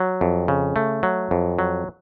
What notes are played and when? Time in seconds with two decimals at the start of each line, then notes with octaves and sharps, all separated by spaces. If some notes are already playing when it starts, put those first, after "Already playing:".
Already playing: F#3
0.21 F2
0.48 C#3
0.76 A3
1.03 F#3
1.31 F2
1.59 F#3